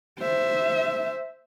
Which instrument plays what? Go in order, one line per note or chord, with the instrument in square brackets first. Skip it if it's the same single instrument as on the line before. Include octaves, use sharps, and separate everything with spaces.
[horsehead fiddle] C5 E5